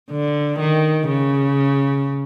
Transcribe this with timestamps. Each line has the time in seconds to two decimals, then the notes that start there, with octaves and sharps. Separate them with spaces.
0.11 D3
0.59 D#3
1.08 C#3